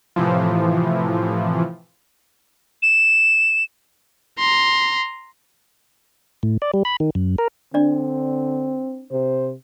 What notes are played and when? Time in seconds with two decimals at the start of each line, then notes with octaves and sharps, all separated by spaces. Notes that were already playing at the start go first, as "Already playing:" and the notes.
0.16 A2 C3 E3 F3
2.82 E7
4.39 A#5 C6
6.43 A2
6.62 D5
6.74 G3
6.85 B5
7.00 D#3
7.15 F#2
7.38 A#4
7.74 D3 C4 D4 D5
9.12 C3 C5